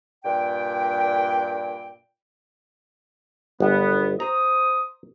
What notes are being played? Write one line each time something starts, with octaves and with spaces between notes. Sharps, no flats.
G2 A#2 G5
G1 F#2 B3
C5 A#5 D#6